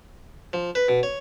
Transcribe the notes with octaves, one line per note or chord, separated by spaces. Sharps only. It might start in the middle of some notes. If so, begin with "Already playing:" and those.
F3
B4
B2
C#5